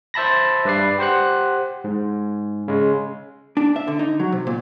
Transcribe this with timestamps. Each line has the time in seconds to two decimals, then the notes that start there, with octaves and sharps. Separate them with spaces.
0.14 C5 E5 A5 B5 A#6
0.65 G2 B4 D5 C7
0.99 G4 C5 F#5 F#6
1.84 G#2
2.68 C#3 G#3
3.57 D4
3.76 E5
3.88 D3
3.99 D#4
4.20 F#3
4.32 C3
4.47 A#2